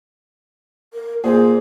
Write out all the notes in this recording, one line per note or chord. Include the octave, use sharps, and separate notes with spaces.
A#4
A#2 G#4 C5